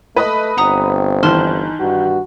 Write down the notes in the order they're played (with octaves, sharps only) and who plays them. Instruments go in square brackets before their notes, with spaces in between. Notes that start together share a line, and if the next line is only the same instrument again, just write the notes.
[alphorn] A3 [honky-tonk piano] B4 D#5 B5
[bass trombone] G1 [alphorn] C4 [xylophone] F#5 A#5 D#6
[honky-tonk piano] D#3 E3 [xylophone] A5 C6 F6
[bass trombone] G2 [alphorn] F#4